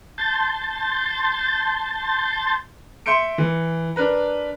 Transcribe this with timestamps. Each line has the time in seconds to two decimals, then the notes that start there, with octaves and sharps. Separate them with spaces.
0.18 A5 C6 G6 A6
3.06 E5 C6 G6 C#7 D7
3.38 E3
3.96 D4 A#4 B4 A#5